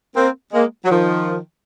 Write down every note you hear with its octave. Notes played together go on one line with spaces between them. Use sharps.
A#3 C4
G#3 A#3
F#3
D#3 F3